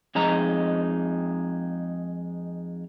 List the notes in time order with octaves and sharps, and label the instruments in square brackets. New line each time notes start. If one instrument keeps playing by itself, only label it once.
[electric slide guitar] F2 G#3 D#4 A#5